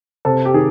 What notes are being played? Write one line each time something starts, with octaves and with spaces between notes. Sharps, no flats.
C3 A4
G4
D#3 G#4